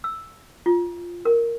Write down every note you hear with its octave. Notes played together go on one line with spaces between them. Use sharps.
E6
F4
A#4